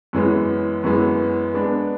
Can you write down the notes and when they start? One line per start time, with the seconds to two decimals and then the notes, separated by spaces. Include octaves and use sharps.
0.13 F#2 E3 G#3 B3
0.84 F#2 E3 G#3 B3
1.54 G#3 B3 D4